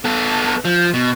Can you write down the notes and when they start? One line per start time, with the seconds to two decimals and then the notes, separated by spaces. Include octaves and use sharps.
0.05 B3 A4
0.65 F3
0.94 B2